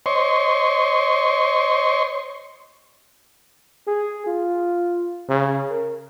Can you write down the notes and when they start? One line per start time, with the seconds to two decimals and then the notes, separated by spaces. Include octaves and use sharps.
0.06 C5 C#5 D#5 C6 C#6
3.87 G#4
4.27 F4
5.29 C#3
5.71 A#4